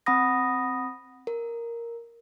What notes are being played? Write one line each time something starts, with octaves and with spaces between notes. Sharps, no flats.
C4 F#5 B5 D#6 A#6
A#4